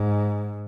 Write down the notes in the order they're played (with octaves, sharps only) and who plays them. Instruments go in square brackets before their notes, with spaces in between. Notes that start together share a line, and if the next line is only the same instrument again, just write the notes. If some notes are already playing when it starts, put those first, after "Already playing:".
Already playing: [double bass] G#2